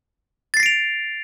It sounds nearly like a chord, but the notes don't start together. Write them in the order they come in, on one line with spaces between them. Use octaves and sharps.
A6 C7 A#6 D7 F7